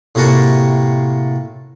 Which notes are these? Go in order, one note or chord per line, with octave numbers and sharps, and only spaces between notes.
A2 C3 A#3 F#4 A5